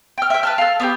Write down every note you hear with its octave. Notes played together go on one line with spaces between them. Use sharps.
G5 F6
E5 G5
B4 A5 F6
A4 F5
B3 D4 G4